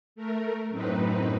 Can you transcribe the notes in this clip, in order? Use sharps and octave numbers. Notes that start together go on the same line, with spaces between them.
A3 A#4
F#2 A2 C4 D#4 B4